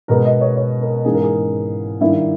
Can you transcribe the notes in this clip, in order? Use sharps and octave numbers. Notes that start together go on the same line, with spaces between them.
B2 G#3 B3 A#4
D#5
C#5
C#5
A#4
G#2 E3 A#3 C#4 G#4
A#4
G#4
G2 D#3 A#3 E4